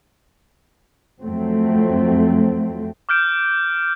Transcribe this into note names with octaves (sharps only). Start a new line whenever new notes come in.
F2 F#3 A3 C4
D6 F6 G6 D7